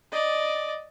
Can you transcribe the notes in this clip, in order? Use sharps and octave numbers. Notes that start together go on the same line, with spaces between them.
D5 D#5